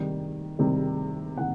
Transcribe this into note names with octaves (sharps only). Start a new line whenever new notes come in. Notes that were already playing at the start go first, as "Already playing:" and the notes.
Already playing: C3 D#3 G3
C3 D#3 G3
C3 D#3 F#5